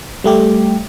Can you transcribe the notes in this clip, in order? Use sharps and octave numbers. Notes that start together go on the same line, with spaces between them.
G3 A3 G4